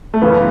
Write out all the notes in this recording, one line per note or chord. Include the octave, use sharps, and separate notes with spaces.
A3
F#2 C#3 E3 B3